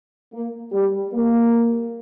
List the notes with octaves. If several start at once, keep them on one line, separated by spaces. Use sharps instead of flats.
A#3
G3
A#3